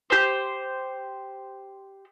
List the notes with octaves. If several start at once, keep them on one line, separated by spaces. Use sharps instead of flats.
G4 C5